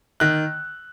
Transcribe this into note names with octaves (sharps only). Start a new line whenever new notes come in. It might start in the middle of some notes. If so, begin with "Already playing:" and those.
D#3 F#6